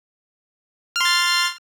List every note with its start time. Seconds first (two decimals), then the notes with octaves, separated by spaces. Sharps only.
0.96 F6
1.01 C6
1.05 A6